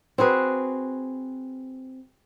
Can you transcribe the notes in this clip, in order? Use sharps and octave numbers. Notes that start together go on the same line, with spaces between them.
C4 F#4 G#4 B4